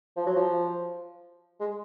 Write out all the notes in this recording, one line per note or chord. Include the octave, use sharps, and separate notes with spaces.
F3
F#3
F3
G#3